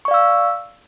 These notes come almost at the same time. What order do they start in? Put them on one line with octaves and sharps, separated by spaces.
C#6 D5 F5 E6